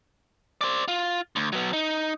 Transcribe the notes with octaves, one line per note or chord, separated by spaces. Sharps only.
C5 D5
F4
D2
F#3 B3
D#4